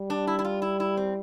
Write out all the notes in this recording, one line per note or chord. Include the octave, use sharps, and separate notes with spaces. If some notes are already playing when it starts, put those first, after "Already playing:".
Already playing: G3
D4
E4
E4
F4
E4
E4
C4